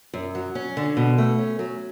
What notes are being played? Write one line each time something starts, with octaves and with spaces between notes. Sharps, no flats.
F#2
F#3
C#4
D3
B2
A3
C#4
F#3